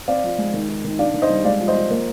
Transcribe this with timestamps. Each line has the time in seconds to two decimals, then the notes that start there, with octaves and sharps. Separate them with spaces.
0.08 C4 D5 F5
0.24 F3
0.38 G#3
0.54 D#3
0.69 D#4
0.84 D#3
0.99 D4 D5 F5
1.14 D#3
1.22 C5 D#5
1.29 G3
1.44 G#3 D5 F5
1.60 F3
1.68 C5 D#5
1.75 F3
1.90 A#3